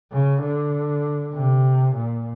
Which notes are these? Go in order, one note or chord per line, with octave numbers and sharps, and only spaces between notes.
C#3
D3
C3
A#2